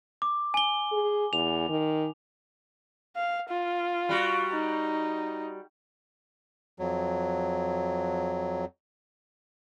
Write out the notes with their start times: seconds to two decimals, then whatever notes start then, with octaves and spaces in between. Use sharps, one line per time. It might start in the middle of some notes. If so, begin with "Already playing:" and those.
0.22 D6
0.54 G#5 G7
0.92 G#4
1.33 E2 F7
1.69 D#3
3.16 F5
3.49 F4
4.09 G3 F#4
4.51 D#4
6.79 F2 F#3